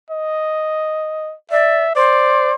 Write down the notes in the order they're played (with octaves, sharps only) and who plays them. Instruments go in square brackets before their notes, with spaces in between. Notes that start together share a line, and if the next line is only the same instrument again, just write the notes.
[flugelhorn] D#5
[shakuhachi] D5 [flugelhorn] E5
[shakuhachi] C5 [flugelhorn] D5